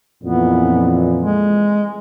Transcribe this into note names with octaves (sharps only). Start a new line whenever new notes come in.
F2 A#2 E3 B3
G#3